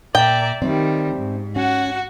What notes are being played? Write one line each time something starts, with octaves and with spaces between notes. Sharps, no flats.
A#2 D5 E5 G5 A#5
D#3 G3 A3 C4 D5
G#2
C#4 F#4 F#5